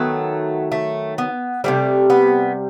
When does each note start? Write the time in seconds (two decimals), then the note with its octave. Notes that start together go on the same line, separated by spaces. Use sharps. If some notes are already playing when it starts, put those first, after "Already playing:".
Already playing: D#3 F#3 A3 B3
0.72 A3
1.18 B3
1.64 C3 D#3 G3 A3
2.10 B3